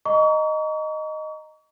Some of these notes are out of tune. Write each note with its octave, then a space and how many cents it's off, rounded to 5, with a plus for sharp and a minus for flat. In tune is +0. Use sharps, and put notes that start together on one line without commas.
D#5 -5 A#5 +0 C#6 +40